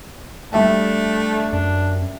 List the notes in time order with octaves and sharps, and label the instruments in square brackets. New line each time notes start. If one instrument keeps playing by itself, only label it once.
[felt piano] G3 E5 A5 [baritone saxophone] A3 [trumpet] D4
[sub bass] F#2 [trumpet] D4